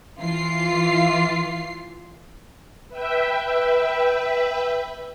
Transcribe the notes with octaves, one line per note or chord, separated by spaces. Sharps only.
E3 F4 C7
B4 E5 G5